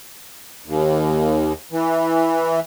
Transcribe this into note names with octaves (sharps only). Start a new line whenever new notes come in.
D#2
E3